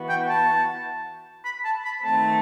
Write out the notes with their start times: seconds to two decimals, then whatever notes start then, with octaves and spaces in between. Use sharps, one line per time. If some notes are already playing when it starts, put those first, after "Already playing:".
Already playing: E3 B3 F#4
0.09 G5
0.29 A5
1.45 B5
1.65 A5
1.85 B5
2.04 D#3 A3 C4 A5